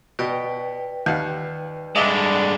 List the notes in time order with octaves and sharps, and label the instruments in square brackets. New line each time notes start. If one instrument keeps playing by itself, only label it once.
[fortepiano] B2 [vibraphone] B4 D5 G5
[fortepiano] D#2 F5 F#5
[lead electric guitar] G2 G#3 [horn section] D3 D4 [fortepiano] D#5 E5